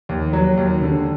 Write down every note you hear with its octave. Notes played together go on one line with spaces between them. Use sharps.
D#2
F#3
D#2
D3